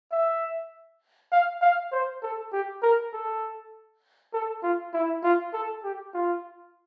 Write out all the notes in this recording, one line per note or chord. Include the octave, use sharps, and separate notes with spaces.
E5
F5
F5
C5
A4
G4
A#4
A4
A4
F4
E4
F4
A4
G4
F4